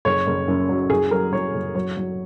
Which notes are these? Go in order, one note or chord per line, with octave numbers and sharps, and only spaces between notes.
F#1 C#5
F#1
F#2
F#3
F#1 G#4
F#3 A#4
F#3 C#5
F#1
F#3 C#5
F#3